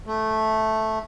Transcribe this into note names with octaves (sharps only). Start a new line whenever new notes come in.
A3